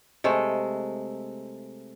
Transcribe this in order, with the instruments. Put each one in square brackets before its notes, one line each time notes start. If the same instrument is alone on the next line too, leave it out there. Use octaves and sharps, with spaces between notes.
[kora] C3 G#3 A3